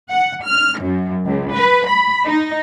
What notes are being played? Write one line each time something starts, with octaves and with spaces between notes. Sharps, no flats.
F#5
F6
F#2
C#2
B4
B5
D#4